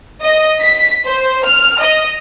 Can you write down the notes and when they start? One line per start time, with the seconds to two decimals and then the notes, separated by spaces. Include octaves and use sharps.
0.25 D#5
0.62 B6
1.06 C5
1.45 F6
1.81 D#5